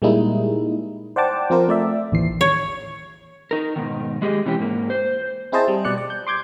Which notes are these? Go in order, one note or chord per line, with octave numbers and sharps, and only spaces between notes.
A#2 G3 G#3 A#3 D#4 E4
C5 D5 F#5 G5 A5 D6
F3 C4 F4 A#4 C5
A3 D5 E5
A1 D#2 E3 C7
C#5
D#4 A#4
G#2 B2 D#3
G#3 G4 G#4 D#5
C3 E3 C#4 F4 G4
G#2 A#3
C5
C4 E4 G#4 C5 D#5 A5
G3
B2 G3 D5 F#6 C#7
D5
G6
C6 D6 G6 G#6